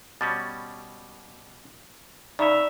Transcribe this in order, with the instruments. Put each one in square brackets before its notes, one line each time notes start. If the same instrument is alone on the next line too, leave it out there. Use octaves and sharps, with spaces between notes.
[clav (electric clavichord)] B2 G3 C#4 [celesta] D6 [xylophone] A6
[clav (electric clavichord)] C#3 [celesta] D#4 A#5 B5 [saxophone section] C#5 E5 [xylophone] D5